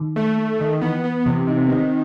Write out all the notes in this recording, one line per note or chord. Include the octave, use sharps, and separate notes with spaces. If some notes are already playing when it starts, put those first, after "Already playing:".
Already playing: D#3
A3
A3
D#3
E3 B3
B3
C3 E3
C3 D#4
C4
D#3 B3
C4